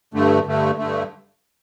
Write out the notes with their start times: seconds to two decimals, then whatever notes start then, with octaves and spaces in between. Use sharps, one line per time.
0.14 G2 D3 A3
0.46 G2 D3 A3
0.78 G2 D3 A3